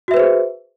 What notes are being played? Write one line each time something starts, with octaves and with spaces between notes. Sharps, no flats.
F#4 G#4 B4 C5 E5